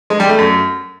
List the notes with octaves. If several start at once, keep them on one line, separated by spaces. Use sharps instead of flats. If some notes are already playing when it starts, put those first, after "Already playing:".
G#3
G3
A3
F#2